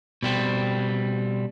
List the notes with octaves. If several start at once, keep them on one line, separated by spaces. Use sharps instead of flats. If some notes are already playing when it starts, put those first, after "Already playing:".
B2 G3 C4